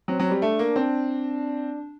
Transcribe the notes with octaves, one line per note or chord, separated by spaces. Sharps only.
F#3 C4
F#3
C4
G3
A3 D4
A#3
C4